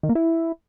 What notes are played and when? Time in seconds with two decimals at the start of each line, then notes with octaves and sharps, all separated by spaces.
0.03 D#3
0.09 A#3
0.15 E4